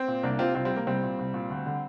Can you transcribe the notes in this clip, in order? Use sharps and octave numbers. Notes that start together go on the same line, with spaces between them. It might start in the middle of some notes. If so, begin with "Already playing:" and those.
Already playing: C4
A#2
C2 A#3 D4
C3 C4 F4
C2 C4 F4
G3 C4
C3
A#3
C2 G3 C4
A#2
C2
A#2
D2
D3